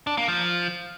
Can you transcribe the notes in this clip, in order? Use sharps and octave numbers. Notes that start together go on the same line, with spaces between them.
D4
A#3
F3